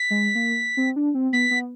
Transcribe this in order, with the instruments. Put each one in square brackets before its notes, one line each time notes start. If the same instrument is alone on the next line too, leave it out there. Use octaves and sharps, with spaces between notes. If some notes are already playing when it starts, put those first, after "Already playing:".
Already playing: [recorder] B6
[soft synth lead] G#3
A#3
C4
D4
C4
[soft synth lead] B3 [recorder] B6
[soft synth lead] B3